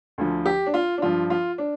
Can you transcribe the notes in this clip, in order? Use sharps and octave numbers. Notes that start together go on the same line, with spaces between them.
D2 D3 F3
G4
D4
F4
D4
G2 F3 F4
F4
D4